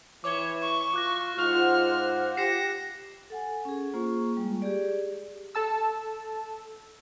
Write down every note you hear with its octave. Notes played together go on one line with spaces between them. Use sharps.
E3 C#5 D6 G7
C#6
F4 D6 F#6 A#6
G#2 F4 C5 F#5 F6
G4 A#6 C7 C#7 E7
A4 F#5 G#5
C#4 G#4
A#3 F4 G#4 C5 C#6
G3 G#3
G4 G#4 D5
A4 A5 E6